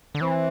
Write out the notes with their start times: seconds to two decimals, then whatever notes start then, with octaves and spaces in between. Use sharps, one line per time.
0.15 D3
0.21 E3 C4